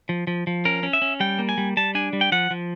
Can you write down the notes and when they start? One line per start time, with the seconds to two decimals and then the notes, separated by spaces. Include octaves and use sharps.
0.09 F3
0.27 F3
0.47 F3
0.65 C#4 A#4
0.83 C#4
0.93 E5
1.02 C#4
1.20 G3 G5
1.39 A#3
1.49 G#5
1.58 G3
1.77 G3 A5
1.95 D4 G#5
2.13 G3
2.21 G5
2.32 F3 F#5
2.51 F3